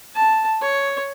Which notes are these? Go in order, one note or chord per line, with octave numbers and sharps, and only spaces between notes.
A5
C#5